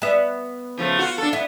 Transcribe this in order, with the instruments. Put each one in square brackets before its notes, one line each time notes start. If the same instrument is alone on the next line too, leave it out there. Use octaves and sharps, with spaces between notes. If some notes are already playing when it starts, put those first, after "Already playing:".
[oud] B3 E5
[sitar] C#3 F3 A3
F4 F#4
D4 A4
[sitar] B3 [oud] E4